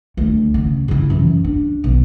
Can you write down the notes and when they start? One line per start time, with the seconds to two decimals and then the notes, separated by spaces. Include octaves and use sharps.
0.17 D2
0.54 C#3
0.88 C#3 E4
1.10 F#2 E3
1.44 D4
1.84 B1